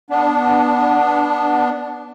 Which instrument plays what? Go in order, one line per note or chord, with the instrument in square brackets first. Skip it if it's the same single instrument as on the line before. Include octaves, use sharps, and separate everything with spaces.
[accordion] B3 D4